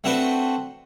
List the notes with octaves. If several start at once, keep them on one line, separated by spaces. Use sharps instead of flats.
A3 C4 D4 F#4 B4 G5